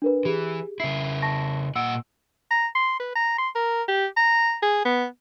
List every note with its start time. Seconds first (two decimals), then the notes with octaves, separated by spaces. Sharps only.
0.02 D4 A#4 B4
0.25 E3 G4 G#4
0.80 C#3 E4 C7
1.22 A5 C#6 A#6
1.76 A#2 F#5 E6 D7
2.51 A#5
2.75 C6
3.00 B4
3.16 A#5
3.38 C6
3.55 A#4
3.88 G4
4.17 A#5
4.63 G#4
4.85 B3